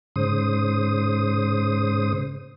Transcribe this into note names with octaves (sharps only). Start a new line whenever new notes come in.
G#2 C#3 C5 D#6